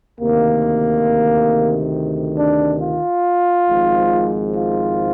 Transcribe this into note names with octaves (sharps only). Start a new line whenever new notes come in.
D2 C3 D#3 A#3
D4
F4
G#1 G#2 F3
F4